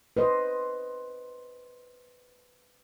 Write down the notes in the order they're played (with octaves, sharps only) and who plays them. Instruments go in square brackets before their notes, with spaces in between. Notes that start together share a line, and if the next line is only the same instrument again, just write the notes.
[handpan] B4 C5 D#5